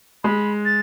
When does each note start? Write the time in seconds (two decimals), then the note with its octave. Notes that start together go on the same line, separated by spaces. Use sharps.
0.24 G#3 B5
0.65 A6